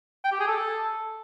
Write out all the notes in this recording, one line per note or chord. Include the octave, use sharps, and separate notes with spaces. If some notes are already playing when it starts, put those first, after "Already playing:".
G5
G4
G#4
A4